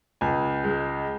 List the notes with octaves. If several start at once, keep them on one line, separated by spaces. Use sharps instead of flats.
C#2 G#5
G#3